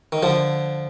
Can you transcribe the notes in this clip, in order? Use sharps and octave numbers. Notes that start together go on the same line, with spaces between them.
D#3
D3 F3